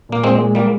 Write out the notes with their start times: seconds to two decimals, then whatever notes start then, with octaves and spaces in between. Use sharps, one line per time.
0.09 A#2 A#3
0.24 A#2 G#3 C4
0.40 G#3
0.55 G3 G#3 A#3